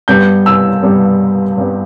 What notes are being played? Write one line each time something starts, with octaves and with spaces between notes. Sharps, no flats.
G2 G3 B3 G6
E6
G2 G3 B3
G2 G3 B3